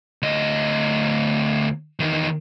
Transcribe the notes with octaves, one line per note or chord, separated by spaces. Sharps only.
D2 D#5
E2 D#3